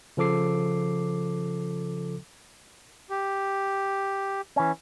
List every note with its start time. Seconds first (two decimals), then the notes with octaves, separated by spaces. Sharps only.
0.17 C#3 F3 A4 D6 C7
3.10 G4
4.56 E3 C#4